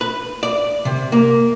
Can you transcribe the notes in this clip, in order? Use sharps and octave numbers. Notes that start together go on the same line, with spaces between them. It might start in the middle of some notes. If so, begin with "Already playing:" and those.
B4
D5
C3
A#3